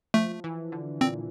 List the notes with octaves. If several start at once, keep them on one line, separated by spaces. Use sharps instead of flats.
F3 A3
E3
D3
A#2 C4